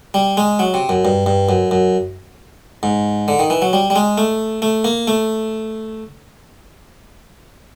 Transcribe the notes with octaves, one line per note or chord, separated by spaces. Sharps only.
G3
G#3
F#3
C3
F#2
G2
G2
F#2
F#2
G#2
D3
D#3
E3
F#3
G3
G3
G#3
A3
A3
A#3
A3